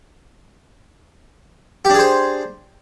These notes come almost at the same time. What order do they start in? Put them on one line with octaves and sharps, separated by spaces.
G4 D4 G#4 C5